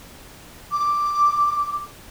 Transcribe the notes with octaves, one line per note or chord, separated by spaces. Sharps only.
D6